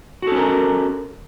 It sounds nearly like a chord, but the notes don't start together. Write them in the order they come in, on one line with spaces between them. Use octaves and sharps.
F#4 A4 C#4 A#4